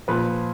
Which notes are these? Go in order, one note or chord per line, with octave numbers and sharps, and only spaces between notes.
A#2 F3 B4